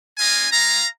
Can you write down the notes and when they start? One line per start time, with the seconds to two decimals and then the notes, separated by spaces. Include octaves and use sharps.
0.18 A#3 C#4 F4 D#5 G#5
0.51 G#3 F4 F5 A#5